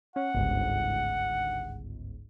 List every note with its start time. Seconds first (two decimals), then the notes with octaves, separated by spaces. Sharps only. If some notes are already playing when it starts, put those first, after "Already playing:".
0.16 C#4 F#5
0.35 G1 C#2 G#2